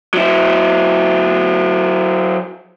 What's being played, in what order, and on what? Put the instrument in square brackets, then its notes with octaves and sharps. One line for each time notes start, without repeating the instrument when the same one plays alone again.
[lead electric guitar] F#3 E4